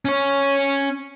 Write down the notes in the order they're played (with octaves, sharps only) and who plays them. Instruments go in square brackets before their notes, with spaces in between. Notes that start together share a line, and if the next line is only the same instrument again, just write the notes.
[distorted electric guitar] C#4 C#5